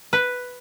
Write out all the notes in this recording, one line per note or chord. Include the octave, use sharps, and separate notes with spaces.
B4